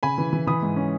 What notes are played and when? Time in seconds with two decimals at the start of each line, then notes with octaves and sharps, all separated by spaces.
0.03 C#3 G#5 B5
0.18 E3
0.33 E3
0.47 E3 B5 D#6
0.62 G#2
0.76 C#4